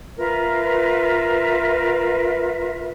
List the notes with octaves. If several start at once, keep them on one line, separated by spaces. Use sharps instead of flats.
F4 A#4 B4 E5